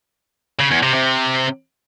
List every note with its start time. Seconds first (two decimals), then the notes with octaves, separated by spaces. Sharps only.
0.60 C#3
0.71 E2
0.83 C3
0.94 C3